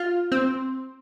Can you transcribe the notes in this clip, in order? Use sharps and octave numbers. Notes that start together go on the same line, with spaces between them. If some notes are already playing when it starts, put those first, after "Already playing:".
Already playing: F4
C4